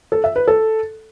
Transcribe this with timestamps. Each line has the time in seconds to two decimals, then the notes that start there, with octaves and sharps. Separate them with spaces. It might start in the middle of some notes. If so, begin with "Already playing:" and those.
0.12 A4
0.24 E5
0.36 B4
0.48 A4